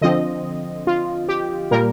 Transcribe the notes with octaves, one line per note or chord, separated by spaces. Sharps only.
D3 F3 C4 D#5
F4
G4
A#2 G3 A#3 A#4